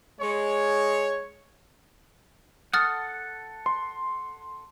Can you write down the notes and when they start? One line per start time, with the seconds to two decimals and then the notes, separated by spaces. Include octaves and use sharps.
0.20 G#3 C#5
2.73 A4 F#5 D#6 F6 A6
3.66 C6